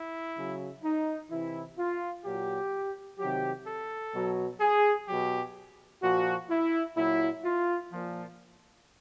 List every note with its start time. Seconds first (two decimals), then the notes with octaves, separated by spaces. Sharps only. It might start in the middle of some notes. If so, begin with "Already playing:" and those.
Already playing: E4
0.36 C#3 F#3
0.84 D#4
1.30 C3 E3 E4
1.78 F4
2.25 A#2 F#3 G4
3.19 C3 D#3 F#3 G4
3.66 A4
4.14 B2 F#3
4.61 G#4
5.07 B2 F#3 G4
6.02 A#2 F3 F#4
6.50 E4
6.96 A#2 F#3 E4
7.44 F4
7.92 A#2 F3